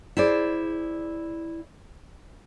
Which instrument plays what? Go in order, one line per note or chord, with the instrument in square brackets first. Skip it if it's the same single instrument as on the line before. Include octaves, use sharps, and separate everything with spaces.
[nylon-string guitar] E4 G#4 C5 D5